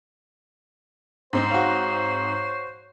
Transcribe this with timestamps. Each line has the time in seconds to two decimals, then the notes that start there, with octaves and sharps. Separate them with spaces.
1.33 G#2 C4 D#4 C5
1.51 F#4 C#5 F5